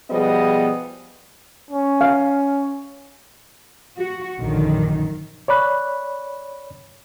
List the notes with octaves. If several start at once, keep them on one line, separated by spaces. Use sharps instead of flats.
B2 F3 G3 B3 G#4 D#5
C#4
F5
F#4
A#1 F#2 D3 D#3
C#5 D5 B5 F#6